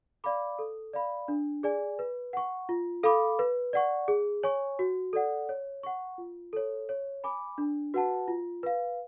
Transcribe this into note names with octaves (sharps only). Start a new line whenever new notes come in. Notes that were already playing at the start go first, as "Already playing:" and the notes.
D5 F5 B5 D6
A4
D5 F5 B5
D4
G#4 D5 G#5
B4
F#5 C#6
F4
A4 F5 B5 D6
B4
D5 F#5 C#6
G#4
C#5 G#5 C#6
F#4
A4 D5 F#5
C#5
F#5 C#6
F4
A4 C#5
C#5
G#5 B5 D6
D4
F#4 B4 F#5 A5
F4
B4 F5